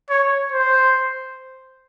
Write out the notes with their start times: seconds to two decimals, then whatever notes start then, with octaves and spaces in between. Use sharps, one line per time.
0.10 C#5
0.52 C5